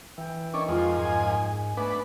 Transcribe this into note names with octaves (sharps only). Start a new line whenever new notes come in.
E3 G5
D#3 C#4 D4
F2 G#3 F4
G#2 G#5
G#5
A3 B3 D4 B4